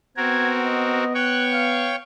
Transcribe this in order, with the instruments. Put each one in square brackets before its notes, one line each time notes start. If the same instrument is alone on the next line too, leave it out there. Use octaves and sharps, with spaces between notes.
[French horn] B3 [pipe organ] C4 F#4 A#4 [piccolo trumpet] G#6
[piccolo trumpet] D#5
[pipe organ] C#5 G5 C#6 [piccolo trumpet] F#6
[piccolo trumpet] F5